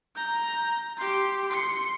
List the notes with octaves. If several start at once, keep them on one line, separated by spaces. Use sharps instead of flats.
A#5 G6
G4 C6
C6 C#7